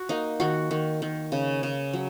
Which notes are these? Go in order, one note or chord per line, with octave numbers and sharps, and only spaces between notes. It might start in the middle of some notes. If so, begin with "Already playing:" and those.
Already playing: F#4
A#3 D#4
D#3 F#4
D#3
D#3
C#3
C#3
F#3